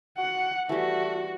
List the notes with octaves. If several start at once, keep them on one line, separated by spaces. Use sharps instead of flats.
F#4 F#5
E3 G3 A3 F#4